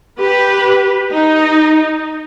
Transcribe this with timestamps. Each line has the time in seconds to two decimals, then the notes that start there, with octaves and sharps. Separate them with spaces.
0.19 G4 B4
1.12 D#4